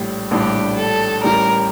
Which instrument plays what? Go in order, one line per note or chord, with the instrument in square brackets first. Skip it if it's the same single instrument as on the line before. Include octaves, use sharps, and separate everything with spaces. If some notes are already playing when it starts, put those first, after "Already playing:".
Already playing: [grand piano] A#1 A2 G3
[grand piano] A#1 A2 G3 D4 [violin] G4
[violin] A4
[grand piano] A1 A2 G3 [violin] A#4